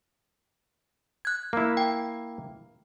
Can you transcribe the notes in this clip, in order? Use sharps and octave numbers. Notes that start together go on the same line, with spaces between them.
F#6 G#6
A#3 E4
G5